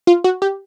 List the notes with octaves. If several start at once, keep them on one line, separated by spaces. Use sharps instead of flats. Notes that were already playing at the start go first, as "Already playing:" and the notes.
F4
F#4
G4